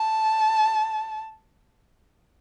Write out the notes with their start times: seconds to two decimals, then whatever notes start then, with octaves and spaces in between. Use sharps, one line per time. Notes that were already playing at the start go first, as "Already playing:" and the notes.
Already playing: A5